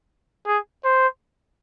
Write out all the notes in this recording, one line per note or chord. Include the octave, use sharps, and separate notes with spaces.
G#4
C5